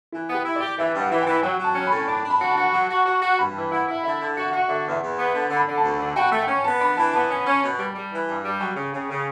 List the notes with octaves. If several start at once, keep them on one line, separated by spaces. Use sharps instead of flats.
E3 E4
B3
G4
E4
D5
G4
E3 E5
G2 F#5
E3
E3 G5
F#3 G5
F#3
A5
C#4
A2 B5
D4 A5
D4
B5
F#4
A5
F#4
F#3
F#4
F#4
F#4
G2 B5
E3
E4 F#5
E4
D3 E5
D3
F#4 F#5
F#4
D3 E5
E2 E5
E2
B3
D3
D3
B5
D3
A5
D2
D3
F#4 G5
F#5
A3
C#4 G5
B3 A5
D4 B5
E3 A5
B3 A5
C#4
C#4
B2
G3
G3
E3
G2
G3
F#3 G5
C#3
C#3
C#3